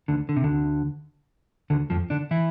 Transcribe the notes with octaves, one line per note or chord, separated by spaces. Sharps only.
D2 D3
D3
C3
D2 D3
D2 D3
F2 F3
D3 D4
E3 E4